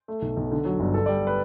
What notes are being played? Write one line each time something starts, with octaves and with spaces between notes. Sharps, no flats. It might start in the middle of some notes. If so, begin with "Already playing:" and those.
A3
B1
B1
D3
F#3
G1
D3 A4
G3 D5
B4